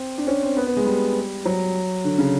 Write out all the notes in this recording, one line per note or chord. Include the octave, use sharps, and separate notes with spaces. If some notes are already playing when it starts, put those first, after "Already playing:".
Already playing: C4
D4
C#4
C4
B3
B3
G#3
G3
F#3
D3
C#3